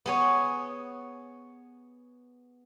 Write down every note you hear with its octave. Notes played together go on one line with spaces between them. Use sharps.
B3 G#4 C#5